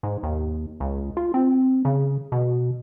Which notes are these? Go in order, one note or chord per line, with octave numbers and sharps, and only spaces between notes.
G#2
D#2
C#2
F4
C4
C#3
B2